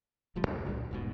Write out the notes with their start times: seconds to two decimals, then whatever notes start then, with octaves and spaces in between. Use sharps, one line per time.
0.36 D1 D2 F3 G3
0.47 D#2 F#3
0.65 C2 G2 A#2 D3
0.91 E1 G#2 B2